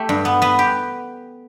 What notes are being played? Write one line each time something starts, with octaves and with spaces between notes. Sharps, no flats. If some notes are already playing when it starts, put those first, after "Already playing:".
Already playing: A3 G4
G2
B3
B3 B4
G4